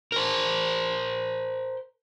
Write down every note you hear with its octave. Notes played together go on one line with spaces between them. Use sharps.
A#4 C5